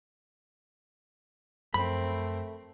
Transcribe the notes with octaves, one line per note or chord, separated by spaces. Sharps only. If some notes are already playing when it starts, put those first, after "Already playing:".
F#2 F3 A3 C4 A#4 B5